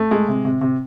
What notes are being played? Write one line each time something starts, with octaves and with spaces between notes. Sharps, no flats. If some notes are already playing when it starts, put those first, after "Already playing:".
Already playing: A3
G#3
C3
C3
C3